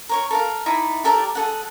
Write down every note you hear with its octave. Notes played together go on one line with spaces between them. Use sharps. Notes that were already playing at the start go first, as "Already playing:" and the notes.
A#4 C#5 C#6
A4 A#4 F5
D#4 E4 D5
G4 A4 A#4 D5
G#4 A4 F#5